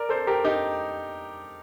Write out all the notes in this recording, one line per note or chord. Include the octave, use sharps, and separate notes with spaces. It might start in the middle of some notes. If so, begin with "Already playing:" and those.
Already playing: A#4 D5
A4 C5
G4 A#4
D#4 G4